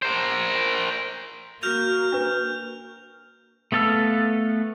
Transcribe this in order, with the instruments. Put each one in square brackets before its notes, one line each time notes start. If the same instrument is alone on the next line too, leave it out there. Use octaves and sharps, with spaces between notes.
[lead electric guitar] A#4 C5
[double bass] A#3 [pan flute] F#4 [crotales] F6 G6 F7
[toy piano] D4 B4
[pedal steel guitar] A3 B3 A4 F5 E6